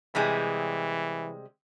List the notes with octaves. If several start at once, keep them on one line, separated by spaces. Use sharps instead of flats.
C3 E3 G3 G#3